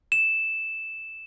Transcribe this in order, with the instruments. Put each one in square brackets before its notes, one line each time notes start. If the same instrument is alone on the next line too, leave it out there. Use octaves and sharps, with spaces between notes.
[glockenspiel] E7